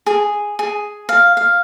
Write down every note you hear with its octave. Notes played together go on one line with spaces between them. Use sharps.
G#4
G#4
F5
F5